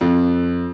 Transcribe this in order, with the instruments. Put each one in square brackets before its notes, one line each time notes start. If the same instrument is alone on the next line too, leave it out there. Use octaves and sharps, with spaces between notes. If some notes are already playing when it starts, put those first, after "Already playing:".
[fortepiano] F2